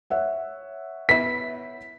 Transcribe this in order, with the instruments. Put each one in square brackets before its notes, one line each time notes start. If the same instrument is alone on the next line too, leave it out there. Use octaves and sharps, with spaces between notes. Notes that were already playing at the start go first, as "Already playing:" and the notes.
[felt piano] C#5 E5 F#5
[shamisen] B3 E4 [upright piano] B6